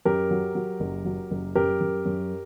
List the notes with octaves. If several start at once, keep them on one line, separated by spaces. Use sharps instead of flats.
F#2 G4 A#4
F#3
F#3
F#1
F#3
F#1
F#2 G4 A#4
F#2
F#2